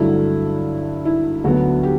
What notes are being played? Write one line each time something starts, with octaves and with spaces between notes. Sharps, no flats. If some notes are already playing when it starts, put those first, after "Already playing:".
Already playing: G2 D3 F#3 A3 E4
E4
D2 D3 F#3 B3 F#4
G4